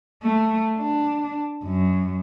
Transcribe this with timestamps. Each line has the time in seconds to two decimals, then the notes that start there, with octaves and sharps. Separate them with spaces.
0.23 A3
0.78 D4
1.64 F#2